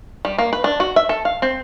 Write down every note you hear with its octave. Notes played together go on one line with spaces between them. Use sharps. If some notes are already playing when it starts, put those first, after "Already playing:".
G3
A#3
B4
D4
F#4
E5
A4
F5
C4